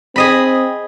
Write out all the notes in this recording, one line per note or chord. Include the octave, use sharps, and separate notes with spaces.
C4 G#4 D#5 B5